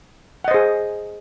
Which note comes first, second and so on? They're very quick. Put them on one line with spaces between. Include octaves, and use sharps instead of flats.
F#5 D#5 C5 G#4